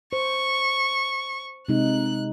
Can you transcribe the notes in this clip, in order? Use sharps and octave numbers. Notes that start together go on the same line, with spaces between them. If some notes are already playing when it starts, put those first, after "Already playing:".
C5 C#6
C3 G#3 D#4 F#6